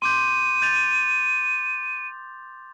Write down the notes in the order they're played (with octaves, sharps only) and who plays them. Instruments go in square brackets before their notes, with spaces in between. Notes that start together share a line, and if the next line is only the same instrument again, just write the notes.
[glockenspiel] C6 D6 G6 [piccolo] D#7
[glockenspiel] G6 A6 F7